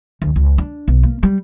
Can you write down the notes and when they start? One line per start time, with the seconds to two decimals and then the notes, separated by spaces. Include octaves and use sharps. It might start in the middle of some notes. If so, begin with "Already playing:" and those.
0.22 D2
0.36 C#2
0.58 D4
0.88 B1
1.03 A#3
1.23 G3